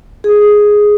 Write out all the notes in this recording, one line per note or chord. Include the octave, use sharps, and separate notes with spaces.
G#4